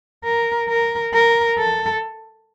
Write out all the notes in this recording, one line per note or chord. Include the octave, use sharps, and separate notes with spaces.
A#4
A#4
A#4
A4